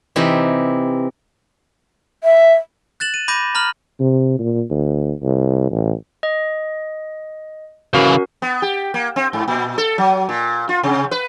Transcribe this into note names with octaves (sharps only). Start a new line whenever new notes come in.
C3 E3 D#4 E4 G4
E5
F#6 A6 E7 F#7
D#7
B5 D6 G6 A#6 D#7
A#5 B5 F6 F#7
C3
A#2
D2
C2
A1
D#5
C#3 E3 C#4 F#4 A#4
B3
G4
A#3
C4
G#2
A#2
A4
F#3
A#2
F4
C3
B4